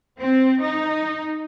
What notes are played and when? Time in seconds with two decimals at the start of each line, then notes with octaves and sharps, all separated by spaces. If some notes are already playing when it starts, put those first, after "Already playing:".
0.20 C4
0.62 D#4